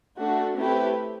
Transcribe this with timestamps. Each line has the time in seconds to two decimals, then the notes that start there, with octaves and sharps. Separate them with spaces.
0.18 A3 D4 F#4
0.56 A3 C4 E4 G4 B4